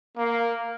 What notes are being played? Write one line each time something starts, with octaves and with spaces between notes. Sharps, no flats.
A#3